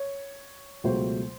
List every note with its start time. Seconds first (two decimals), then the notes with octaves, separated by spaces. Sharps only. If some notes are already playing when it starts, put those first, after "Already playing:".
Already playing: C#5
0.84 C#2 B2 F#3 A3 C5